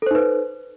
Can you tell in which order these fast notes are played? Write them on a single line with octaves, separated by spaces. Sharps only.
A4 C5 D#4 B4